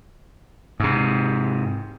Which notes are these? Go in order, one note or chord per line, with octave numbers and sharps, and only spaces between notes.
G#2 C3